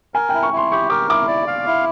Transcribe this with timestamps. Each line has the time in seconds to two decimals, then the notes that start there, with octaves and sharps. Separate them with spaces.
0.14 A#4 G#5
0.29 E4 G5
0.43 C#6
0.52 E4 C6
0.71 G4 C#6
0.90 A#4 D6
1.09 E4 D6
1.28 D5
1.47 F5
1.67 E4